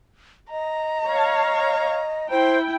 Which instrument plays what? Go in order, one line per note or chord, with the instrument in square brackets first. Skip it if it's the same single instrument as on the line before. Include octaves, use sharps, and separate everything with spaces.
[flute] D#5 [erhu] A#5
[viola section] C#5 F5
[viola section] E4 G5 [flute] C5